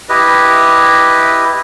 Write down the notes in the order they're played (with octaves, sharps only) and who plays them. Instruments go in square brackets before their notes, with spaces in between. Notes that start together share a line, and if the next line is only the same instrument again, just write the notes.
[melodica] E4 G4 B4 D#5